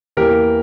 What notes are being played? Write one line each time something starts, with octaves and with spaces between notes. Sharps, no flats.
E2 E3 A#3 G4 A#4